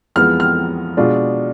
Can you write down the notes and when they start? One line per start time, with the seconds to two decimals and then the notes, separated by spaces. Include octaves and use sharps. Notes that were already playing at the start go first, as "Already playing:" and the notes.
0.16 F2 E3 G#3 B3 F6
0.40 F6
0.97 B2 G#3 D4 F4